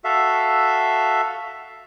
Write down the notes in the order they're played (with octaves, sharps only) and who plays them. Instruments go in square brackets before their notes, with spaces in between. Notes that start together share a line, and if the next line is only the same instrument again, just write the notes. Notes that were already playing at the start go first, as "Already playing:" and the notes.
[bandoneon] F#4 A4 E5 F5